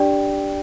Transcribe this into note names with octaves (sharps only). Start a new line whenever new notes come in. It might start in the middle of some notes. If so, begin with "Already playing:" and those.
Already playing: D4 G4 D5 G5